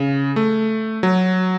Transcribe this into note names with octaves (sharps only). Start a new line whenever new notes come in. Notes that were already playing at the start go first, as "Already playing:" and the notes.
Already playing: C#3
A3
F#3